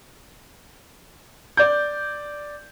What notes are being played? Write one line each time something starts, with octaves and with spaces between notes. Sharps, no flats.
D5 G6